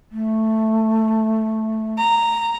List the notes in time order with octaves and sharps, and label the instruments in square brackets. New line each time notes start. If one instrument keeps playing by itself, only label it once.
[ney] A3
[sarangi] A#5